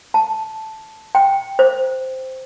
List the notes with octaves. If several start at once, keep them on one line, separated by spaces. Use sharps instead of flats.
A5
G5
C5